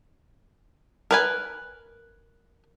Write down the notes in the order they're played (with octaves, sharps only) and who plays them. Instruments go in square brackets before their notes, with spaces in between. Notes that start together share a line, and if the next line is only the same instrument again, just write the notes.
[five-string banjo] A#4 B4 G#5